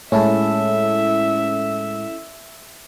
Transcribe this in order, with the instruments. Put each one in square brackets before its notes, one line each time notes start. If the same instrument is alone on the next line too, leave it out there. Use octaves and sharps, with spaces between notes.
[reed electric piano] A2 G#3 [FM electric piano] C#4 E4 A4 [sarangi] E5